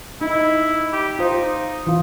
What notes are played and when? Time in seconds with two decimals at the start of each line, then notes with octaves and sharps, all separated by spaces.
0.21 D#4 E4
0.93 G4
1.19 D#4 F4 C5
1.87 E3 F4